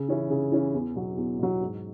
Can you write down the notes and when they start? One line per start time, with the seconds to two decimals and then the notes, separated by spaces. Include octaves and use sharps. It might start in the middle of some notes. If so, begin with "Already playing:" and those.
Already playing: C#3
0.08 E3 C#4 E4
0.30 C#3
0.52 E3 C#4 E4
0.74 E2
0.96 B2 F#3
1.17 E2
1.39 B2 F#3
1.61 G#2